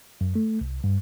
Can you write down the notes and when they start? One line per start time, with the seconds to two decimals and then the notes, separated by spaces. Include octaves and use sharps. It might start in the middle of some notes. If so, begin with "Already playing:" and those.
0.21 F#2
0.36 A3
0.61 C2
0.84 G2